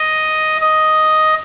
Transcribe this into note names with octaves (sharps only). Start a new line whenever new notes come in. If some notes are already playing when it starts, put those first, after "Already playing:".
Already playing: D#5
D#5